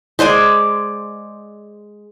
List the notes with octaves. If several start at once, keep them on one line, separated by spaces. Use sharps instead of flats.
G#3 C5 D5 G#5